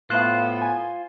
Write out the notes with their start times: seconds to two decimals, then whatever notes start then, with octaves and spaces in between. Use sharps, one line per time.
0.10 A2 B3 F4 C5 F5 F#6
0.62 G#5